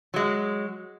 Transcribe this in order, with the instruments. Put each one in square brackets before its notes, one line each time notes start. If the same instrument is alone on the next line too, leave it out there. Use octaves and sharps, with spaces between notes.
[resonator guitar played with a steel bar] F#3 G#3